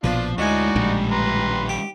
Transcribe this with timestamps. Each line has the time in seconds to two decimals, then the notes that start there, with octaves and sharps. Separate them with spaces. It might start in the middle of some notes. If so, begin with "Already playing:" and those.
0.04 A#1 B2 F3 D4 F4 B4
0.38 D2 G#3 D#4 E4 F#4 C#5 D5 G#5
0.76 A#1 A2 D3 D#3 G3
1.11 B4 A#5 C6
1.69 G4